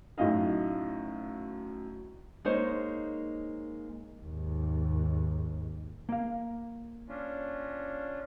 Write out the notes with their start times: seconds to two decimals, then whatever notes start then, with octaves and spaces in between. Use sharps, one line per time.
0.18 F#2 A2 D#4 D#5 F5
2.45 G#3 A#3 D#4 C5 C#5
4.21 D#2 G#2
6.09 A#3 F5
7.08 C#4 D4 F4